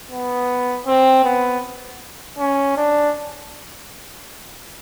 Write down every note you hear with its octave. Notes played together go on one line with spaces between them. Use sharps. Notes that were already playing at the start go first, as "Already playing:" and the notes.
B3
C4
B3
C#4
D4